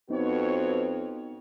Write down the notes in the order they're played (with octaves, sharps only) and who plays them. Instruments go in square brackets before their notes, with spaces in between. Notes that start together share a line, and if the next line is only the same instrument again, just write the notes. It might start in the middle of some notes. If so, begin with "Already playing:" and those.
[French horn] F2 [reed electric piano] B3 D#4 [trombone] C4 [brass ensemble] F#4 B4 C#5